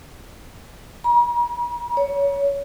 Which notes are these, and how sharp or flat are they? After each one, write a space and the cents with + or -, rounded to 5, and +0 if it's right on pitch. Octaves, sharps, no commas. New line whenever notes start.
A#5 +45
C#5 +15